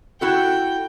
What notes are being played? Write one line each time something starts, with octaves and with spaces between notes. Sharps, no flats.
E4 F#4 A4 G5